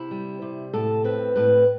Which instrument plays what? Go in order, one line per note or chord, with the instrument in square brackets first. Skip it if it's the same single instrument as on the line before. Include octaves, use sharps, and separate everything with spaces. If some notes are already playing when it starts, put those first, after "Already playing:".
Already playing: [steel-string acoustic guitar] C3 E4
G3
C3
A2 A4
C4 B4
A2 B4